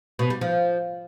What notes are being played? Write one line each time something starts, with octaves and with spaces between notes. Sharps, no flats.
B2
G3
F3